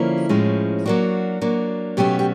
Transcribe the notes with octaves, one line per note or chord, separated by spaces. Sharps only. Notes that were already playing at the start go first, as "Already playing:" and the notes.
Already playing: D3 F3 A#3 C#4 E4 F4
A2 F3 G#3 C#4
F#3 A#3 D4 F#4
F#3 A#3 D4
B2 F#3 A3 C#4 G4
G4